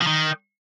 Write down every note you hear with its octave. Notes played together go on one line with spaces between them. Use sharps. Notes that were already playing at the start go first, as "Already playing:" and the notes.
F3
D#3